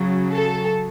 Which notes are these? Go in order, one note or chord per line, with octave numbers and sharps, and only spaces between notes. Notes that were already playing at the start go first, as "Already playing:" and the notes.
Already playing: C#3 F#3
A4